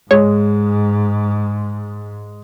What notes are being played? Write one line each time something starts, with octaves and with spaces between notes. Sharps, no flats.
G#2 G#3 C#5